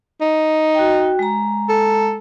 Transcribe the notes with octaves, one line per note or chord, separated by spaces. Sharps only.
D#4
F#4 G5
G#3 A#5
A4